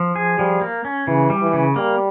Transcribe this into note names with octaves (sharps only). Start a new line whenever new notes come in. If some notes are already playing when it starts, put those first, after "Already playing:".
Already playing: F3
G#4
F3 G3
A#3
C#4
C#3 E3
G3
E3
C#3
G3 A#3